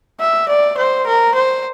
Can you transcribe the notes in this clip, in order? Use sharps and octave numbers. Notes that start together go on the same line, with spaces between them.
E5
D5
C5
A#4
C5